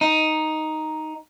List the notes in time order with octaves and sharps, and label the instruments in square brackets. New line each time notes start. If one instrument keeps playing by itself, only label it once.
[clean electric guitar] D#4